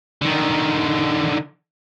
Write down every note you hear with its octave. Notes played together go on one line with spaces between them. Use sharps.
D3 D#3